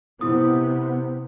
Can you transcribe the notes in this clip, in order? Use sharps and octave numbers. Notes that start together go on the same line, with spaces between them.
C3 B3 E4 D#6